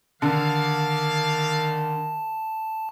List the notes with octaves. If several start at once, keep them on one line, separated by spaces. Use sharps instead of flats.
D3 D#3 A#3 D5 F5 A5